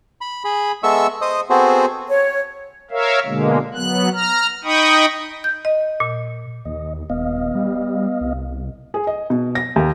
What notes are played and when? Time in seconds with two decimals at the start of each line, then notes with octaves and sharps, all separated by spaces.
0.21 B5
0.44 G#4 B5
0.83 G#3 B3 A4 E5 C#6 E6
1.21 C5 D#5 D#6
1.50 B3 C4 F#4 G#4 A4 C5
2.10 C#5
2.91 A#4 C#5 E5 F5
3.26 B2 D3 G#3 A#3
3.74 F#3 B3 F#6
4.13 A#5 F6
4.64 D#4 D#5 G5 B5 C#6 D#6
5.44 G6
5.65 D#5
6.00 A#2
6.65 D#2 D#5
7.10 D#1 B3 D#5 F5
7.55 G3
8.21 C2
8.94 G#4
9.07 D#5
9.30 B2
9.55 A#6
9.76 D#2